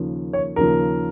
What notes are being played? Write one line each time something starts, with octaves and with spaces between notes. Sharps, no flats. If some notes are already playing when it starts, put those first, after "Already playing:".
Already playing: D#2 C#3 F3 A#3
C#5
D#2 C#3 F3 A#3 A#4